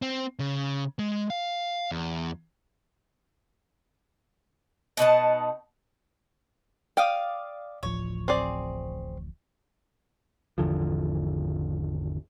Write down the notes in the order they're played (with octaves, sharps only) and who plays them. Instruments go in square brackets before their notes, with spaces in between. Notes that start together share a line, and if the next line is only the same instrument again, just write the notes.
[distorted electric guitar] C4
C#3
G#3
F5
E2
[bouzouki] B2 D#4 F#5 A5
[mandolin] D5 F5 D#6 [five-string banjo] G5
[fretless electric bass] D1 A1 F3 [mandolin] C#5
[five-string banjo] C4 G#4 D5
[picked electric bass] G#1 E2 D3 F3